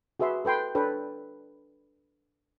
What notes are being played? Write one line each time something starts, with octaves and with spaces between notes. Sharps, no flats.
F#4 G#4 B4 E5 C6
A4 B4 G5 C6
D4 A4 B4 C#5 G5